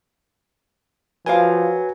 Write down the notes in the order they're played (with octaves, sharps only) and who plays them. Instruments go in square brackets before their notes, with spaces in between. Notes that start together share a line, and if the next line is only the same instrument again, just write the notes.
[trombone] F3 [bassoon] F#3 [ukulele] F4 A#4 F5 [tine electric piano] B4 G#5